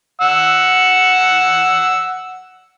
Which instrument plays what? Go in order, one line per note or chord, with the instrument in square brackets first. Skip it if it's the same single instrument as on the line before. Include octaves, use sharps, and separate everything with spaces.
[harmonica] F#5 E6